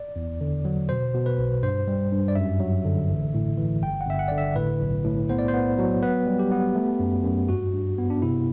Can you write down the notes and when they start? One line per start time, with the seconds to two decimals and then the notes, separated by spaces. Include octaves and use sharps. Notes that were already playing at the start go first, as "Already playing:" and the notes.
Already playing: D5
0.16 E2
0.41 D3
0.65 F#3
0.89 B2 C5
1.14 B2
1.26 B4
1.38 B1
1.63 G2 C5
1.87 G3
2.12 G2
2.28 D5
2.35 F#2 E5
2.60 F#3
2.85 D3
3.09 A1
3.34 A2
3.58 E3
3.82 G1 G5
4.01 F#5
4.06 G1 E5
4.19 F#5
4.28 D3 D5
4.38 E5
4.56 A2 B4
4.81 B1
5.05 A2
5.29 B3 C5
5.39 D5
5.48 C5
5.54 B3
5.78 F#3
6.02 B3 B4
6.26 G3
6.39 G4
6.52 B3
6.75 A3
7.00 F#2
7.24 F#2
7.49 G2 F#4
7.73 G2
7.98 B3
8.10 D4
8.22 C3 E4